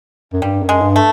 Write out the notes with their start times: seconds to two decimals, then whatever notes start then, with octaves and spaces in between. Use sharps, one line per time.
0.33 F#2
0.42 G2 G3
0.62 F#2
0.69 G#3
0.82 G2
0.96 A3